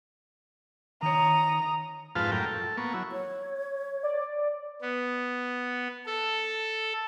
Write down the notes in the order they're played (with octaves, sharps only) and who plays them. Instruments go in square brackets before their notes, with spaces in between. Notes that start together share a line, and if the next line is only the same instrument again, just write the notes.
[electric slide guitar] D#3 C#5 [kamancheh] A#5 D#6
[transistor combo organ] F2 G#2 F4 B4 F5 A5
F#2 A2 A#4 G5
A4
A#3 B3 C#6
F#3 E4
[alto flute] C#5
[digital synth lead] D5
[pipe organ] B3
A4